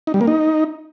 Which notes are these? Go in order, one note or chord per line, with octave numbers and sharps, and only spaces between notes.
D#4
G3
A#3
D#4